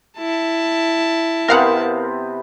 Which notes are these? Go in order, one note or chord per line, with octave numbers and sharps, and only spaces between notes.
E4 A5
C3 B3 C4 A#4 F5 F#5